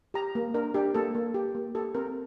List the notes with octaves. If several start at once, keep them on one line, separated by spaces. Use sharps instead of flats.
G4 A#5
A#3
D4 A#4
D4 G4
A#3 A4
A#3
G4
A#3
G4 A4
C4 A#4